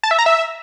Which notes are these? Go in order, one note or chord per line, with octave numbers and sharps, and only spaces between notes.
A5
E5
A#5
E5